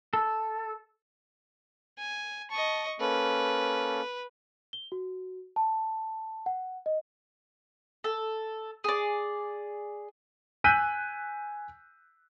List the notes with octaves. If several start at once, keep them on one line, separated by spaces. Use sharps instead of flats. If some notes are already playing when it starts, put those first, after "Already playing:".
A4
G#5
D#5 A5 C#6
A#3 C#4 A4 B4
G7
F#4
A5
F#5
D#5
A4
G#4 D5
G#5 E6 F#6 G6 B6 D#7